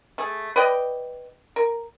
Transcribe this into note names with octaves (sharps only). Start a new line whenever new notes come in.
A3 G#4
B4 D5 D#5 G5
A#4